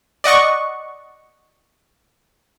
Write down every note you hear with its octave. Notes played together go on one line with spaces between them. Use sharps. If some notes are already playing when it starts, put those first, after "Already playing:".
D5 D#5 F#5 C#6